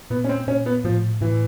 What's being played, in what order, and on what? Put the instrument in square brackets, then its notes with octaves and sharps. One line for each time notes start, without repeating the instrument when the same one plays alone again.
[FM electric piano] A#2 [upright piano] B3
[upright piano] C#4
C4
[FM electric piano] A#2 [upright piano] C#4
[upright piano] B3
[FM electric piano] A2 [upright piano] F3
[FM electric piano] A2 [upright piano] E3